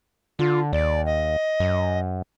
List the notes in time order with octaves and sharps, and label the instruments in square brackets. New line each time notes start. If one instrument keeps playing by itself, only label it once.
[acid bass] D3 [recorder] F4
[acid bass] D#2 [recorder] D5
[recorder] D#5
[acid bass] F#2